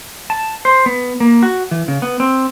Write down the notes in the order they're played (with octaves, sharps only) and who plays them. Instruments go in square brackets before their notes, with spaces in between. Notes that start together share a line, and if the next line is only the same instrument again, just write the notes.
[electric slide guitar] A5
C5
B3
A#3
F#4
E3
C#3
B3
C4